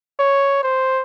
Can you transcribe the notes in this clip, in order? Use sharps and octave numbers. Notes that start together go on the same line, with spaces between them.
C#5
C5